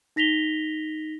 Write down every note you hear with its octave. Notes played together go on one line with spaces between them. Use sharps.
D#4 A#6 B6 F7 G7